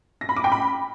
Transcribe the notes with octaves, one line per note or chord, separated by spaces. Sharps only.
A#6
B5
D6
G5
B5